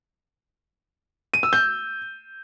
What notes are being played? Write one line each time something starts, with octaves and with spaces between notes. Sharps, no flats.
D#7
E6
G6